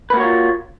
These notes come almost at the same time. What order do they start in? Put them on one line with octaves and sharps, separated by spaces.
B4 A#3 F#4 C#5 F4